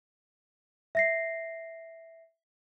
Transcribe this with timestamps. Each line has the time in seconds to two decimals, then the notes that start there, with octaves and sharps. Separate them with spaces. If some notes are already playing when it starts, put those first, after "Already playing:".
0.95 E5 A#6 C7